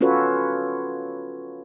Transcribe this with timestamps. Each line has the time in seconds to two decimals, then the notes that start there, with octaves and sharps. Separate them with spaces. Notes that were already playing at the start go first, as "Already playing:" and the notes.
0.01 C#4 F4 F#4 A4 B4 C#5